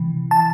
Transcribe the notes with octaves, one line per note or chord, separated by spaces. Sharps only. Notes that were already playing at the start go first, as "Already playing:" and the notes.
Already playing: C3 E3
A5